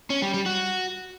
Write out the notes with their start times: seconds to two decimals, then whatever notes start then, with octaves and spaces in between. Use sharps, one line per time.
0.10 C#4
0.22 G3
0.34 G3
0.46 F#4